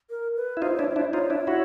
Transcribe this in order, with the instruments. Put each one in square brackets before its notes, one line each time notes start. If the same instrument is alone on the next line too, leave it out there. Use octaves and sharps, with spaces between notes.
[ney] A#4
B4
[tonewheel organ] E4
[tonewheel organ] D#4 F4 [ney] C5
[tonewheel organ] D4 E4 [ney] C#5
[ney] C5
[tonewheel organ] D4 E4
[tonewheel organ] D#4 F4 [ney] C#5
[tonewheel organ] D4 E4
E4 F#4